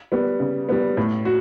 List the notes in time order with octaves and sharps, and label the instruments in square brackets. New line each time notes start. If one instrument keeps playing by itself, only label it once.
[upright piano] G3 B3
C#3
G3 B3
A2
F#4